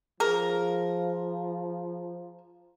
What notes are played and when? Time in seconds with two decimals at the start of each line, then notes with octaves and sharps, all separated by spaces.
0.20 F3 G#4 A#4